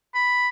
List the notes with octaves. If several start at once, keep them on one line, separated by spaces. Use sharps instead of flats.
B5